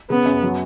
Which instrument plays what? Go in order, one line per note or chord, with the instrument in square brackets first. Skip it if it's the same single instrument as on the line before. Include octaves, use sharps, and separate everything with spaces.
[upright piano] C#3 [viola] B3
[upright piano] F#2
F#3